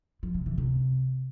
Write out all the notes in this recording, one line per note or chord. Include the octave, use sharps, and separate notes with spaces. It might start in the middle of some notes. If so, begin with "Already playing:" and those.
F3
C3
E3
C3